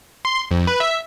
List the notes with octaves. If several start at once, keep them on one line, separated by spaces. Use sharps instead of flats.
C6
F2
B4
E5